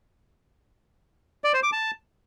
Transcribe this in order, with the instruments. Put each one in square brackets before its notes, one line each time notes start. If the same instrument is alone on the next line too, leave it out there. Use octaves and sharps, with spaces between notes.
[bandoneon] D5
C5
D6
A5